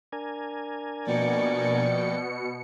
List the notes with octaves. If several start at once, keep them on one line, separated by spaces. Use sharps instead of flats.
D4 A#4 G#5
B2 F3 A#3 D5 G5 C#7